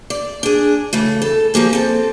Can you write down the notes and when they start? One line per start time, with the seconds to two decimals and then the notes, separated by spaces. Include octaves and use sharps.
0.10 D5
0.43 D4 G#4
0.93 C#3 E3 A3
1.22 A4
1.54 F3 G3 A#3 G#4
1.73 C4 A4